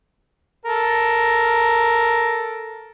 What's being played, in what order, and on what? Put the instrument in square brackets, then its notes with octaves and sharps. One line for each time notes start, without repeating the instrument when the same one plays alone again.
[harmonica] A4 A#4